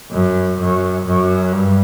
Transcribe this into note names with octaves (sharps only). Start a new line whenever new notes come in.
F#2
F#2
F#2
G2